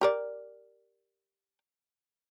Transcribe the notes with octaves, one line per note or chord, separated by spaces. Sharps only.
G4 A#4 D5